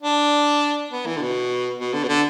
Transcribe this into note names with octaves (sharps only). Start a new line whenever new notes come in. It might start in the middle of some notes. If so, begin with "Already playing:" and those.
D4
B3
E3
D3
B2
B2
D3
B2
D3